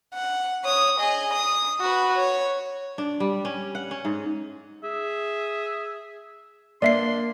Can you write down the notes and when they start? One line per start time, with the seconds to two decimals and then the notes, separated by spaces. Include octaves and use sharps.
0.14 F#5
0.64 C#5 D#6
0.99 G#4 D#5
1.33 D#6
1.81 F#4 B4
2.17 C#5
2.98 D4
3.20 G3
3.45 C#4
3.75 F#5
3.91 C#4
4.05 G#2
4.83 G#4 E5
6.82 A#3 D4 D5 E5 C6 C7